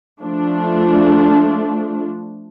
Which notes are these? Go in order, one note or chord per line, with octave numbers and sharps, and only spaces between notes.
F3 A3 D4